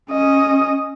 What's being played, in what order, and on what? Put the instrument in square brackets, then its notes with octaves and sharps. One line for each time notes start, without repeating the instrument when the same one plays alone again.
[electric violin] C#4 D#5